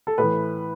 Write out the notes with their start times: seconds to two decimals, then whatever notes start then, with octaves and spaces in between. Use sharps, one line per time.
0.07 A4
0.18 A2 E3 B4